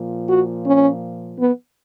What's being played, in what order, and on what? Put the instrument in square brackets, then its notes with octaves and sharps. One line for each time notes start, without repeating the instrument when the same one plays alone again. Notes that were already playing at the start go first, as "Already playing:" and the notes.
Already playing: [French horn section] A#2 F3
F#4
C#4
B3